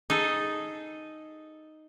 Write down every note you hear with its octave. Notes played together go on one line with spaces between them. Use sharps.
D#4 G#4 A4